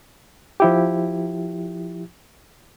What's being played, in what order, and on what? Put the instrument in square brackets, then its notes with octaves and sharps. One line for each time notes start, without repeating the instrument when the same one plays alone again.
[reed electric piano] F3 E4 G4